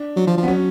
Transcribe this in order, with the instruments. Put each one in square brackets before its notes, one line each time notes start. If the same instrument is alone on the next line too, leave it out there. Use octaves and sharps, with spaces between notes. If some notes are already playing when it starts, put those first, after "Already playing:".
Already playing: [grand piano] D4
[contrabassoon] F#3
F3
F3
[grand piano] B3
[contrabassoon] F#3 [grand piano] C#4